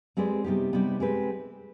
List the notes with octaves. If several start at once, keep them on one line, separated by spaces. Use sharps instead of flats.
G#3 C4 G4 B4 D5
C3 G3 B3 D#4 G4
C3 G3 B3 D#4
G#3 C4 G4 B4